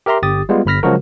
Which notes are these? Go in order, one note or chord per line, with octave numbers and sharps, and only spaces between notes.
G4 A#4 E5 A#5 C6
G1 G4 D#6 A6
G3 G#3 B3 F4
G1 B5 F6 A#6 B6
C#3 F3 F#3 G#3 F#4 A#4